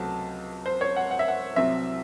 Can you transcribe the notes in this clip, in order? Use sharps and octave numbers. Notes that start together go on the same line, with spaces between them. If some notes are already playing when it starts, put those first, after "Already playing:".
Already playing: C#2 C3 F#3 A3 C4 A5
C5
C#5
F#5
F#5
E5
F#5
C2 C3 F#3 C4 E5